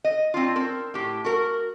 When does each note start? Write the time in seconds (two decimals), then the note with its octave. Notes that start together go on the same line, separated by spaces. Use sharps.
0.04 D#5
0.34 C4 D4 F4
0.56 C4 A#4
0.94 A2 G4
1.25 F#4 A#4